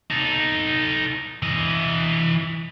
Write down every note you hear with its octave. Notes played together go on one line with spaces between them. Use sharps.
D#4 A4
E3 D#5